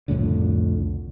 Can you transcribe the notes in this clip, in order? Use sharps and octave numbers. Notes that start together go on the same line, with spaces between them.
C2 F2 A2 D3